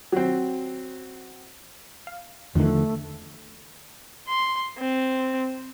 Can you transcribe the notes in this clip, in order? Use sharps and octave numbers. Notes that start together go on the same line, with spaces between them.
F#3 C4
F5
E2 D3 D#3 F3 A3
C6
C4